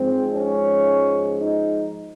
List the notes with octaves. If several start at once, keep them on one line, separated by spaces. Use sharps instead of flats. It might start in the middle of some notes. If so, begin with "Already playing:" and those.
Already playing: G#2 F3 G#3 C4
C#4
D#4